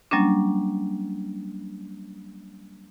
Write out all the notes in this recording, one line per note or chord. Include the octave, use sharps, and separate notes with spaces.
F#3 G3 A#3 C#4 D4